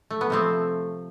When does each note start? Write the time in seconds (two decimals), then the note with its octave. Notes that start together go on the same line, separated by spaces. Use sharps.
0.11 A3
0.21 B3
0.30 C3 F3 A3 C4